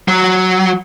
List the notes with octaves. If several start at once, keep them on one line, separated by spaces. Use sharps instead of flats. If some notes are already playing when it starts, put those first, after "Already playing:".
F#3